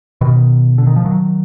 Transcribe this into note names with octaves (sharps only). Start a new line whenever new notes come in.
B2 D#3
D3
D#3
F3
D#3 F#3